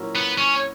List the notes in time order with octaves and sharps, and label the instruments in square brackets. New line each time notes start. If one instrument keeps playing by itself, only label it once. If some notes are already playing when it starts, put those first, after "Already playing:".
Already playing: [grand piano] A#2 F#3 C#4 E4 A#4
[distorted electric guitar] B3
C#4